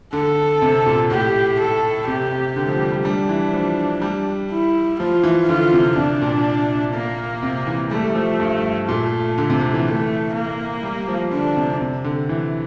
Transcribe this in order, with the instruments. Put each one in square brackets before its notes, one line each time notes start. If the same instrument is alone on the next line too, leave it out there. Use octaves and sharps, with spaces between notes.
[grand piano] D3 [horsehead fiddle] A4
[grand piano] C3
A#2
[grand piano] A2 [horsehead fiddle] G4
[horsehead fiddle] A4
[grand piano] C3 [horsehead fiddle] G4
[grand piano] C3
D3
F3
G3
G3
[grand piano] G3 [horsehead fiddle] D4
[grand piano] E3
F3
G3
[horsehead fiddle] E4
[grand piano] F3 [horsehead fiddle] F4
[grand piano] E3
[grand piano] D3 [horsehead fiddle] F4
[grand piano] C3
[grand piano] C3 [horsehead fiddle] D4
[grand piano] A#2
[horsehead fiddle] A#3
[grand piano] C3
E3
[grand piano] G3 [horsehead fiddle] A3
[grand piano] G3
F3
G2
[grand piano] A#2 [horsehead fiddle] A3
[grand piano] D3
C3
D3
E3
[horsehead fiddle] A3
A#3
[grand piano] G3
F3
[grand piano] D3 [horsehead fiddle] D4
[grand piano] C3
C3
D3
E3